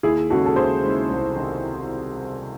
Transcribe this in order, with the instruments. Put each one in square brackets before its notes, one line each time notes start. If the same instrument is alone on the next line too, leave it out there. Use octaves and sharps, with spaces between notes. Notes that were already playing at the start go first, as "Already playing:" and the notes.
[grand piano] D#2 [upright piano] E4 G#4
[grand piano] C#3 G#3 C#4 E4 [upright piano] F#4 A4
[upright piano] A4
[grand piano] D#2 [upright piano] G#4 C5
[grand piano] C#3 G#3 C#4 E4
C2
C3 D#3